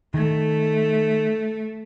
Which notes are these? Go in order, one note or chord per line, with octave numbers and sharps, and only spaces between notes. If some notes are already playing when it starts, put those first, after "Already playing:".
D#3 A3